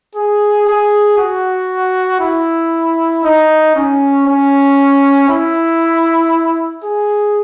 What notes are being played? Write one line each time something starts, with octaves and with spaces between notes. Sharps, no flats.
G#4
G#4
F#4
E4
D#4
C#4
C#4
E4
G#4